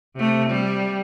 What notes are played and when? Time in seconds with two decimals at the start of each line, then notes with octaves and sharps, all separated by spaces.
0.15 C3 A3
0.49 G3